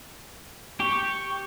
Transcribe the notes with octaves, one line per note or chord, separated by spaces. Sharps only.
G4 C#6